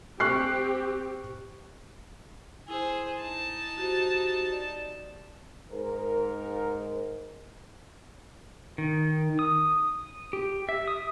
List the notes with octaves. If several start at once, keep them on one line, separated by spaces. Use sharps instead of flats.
C4 G4 C#6 F#6 C7
E4 G#4 C5
D#4 A5
F#4 G4 C5
D5
G#2 A#4
D#3
D#6
G4
E5
D#6